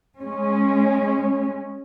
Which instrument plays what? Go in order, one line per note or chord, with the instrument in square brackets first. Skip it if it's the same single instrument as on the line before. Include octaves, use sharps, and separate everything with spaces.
[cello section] G#3 C#4